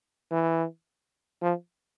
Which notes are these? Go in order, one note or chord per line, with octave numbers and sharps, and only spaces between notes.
E3
F3